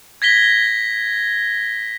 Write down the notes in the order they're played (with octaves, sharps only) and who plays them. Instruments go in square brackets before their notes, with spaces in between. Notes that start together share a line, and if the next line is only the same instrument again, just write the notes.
[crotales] G#6 A#6 B6 G7